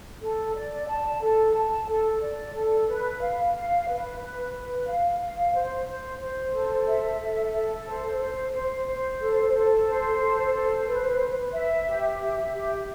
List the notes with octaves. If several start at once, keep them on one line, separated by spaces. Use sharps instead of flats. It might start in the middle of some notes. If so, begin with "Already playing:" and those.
A4
D5
A5
A4
A5
A4
D5
A4
B4
F5
F5
B4
B4
B4
F5
F5
C5
C5
C5
A4
E5
A4
A4
C5
C5
C5
C5
A4
A4
C5
A4
C5
B4
B4
E5
G4
E5
G4